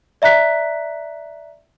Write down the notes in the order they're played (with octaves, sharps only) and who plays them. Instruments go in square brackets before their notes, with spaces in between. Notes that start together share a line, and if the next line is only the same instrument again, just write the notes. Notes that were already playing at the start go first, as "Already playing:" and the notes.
[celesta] D5 E5 A#5 F#6 B6